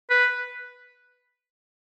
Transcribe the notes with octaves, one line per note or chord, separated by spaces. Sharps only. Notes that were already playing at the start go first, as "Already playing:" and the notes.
B4